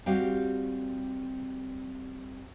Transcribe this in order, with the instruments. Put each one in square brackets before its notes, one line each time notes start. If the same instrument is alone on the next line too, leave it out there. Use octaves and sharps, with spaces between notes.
[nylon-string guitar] G3 C4 F#4 G4 F5